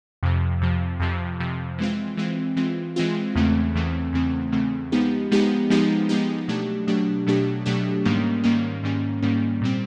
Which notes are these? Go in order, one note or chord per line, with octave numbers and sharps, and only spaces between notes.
F2 C3 F3
F2 C3 F3
F2 C3 F3
F2 C3 F3
E3 G#3 C4 F4
E3 G#3 C4 F4
E3 G#3 C4 F4
E3 G#3 C4 F4
E2 C#3 E3 A3 C4
E2 C#3 E3 A3 C4
E2 C#3 E3 A3 C4
E2 C#3 E3 A3 C4
F3 G#3 B3 D#4 G4
F3 G#3 B3 D#4 G4
F3 G#3 B3 D#4 G4
F3 G#3 B3 D#4 G4
B2 F#3 A3 D4 G4
B2 F#3 A3 D4 G4
B2 F#3 A3 D4 G4
B2 F#3 A3 D4 G4
G#2 D#3 G3 A#3 C#4
G#2 D#3 G3 A#3 C#4
G#2 D#3 G3 A#3 C#4
G#2 D#3 G3 A#3 C#4
A#2 G3 C4